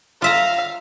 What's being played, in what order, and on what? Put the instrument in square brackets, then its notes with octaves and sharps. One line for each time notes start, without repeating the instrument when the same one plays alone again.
[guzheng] F4 E5 A#5 [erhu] F5